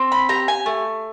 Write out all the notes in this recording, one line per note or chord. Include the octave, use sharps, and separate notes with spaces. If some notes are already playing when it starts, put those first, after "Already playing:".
Already playing: C4
B5
G4 A#5
G#5
A3